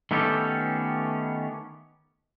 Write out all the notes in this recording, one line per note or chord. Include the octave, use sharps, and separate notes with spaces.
D#3 A3 B3 C#4 G4 A4